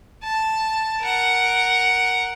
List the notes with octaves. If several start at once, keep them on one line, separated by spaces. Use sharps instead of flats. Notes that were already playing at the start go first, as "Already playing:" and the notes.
A5
A#4 F#5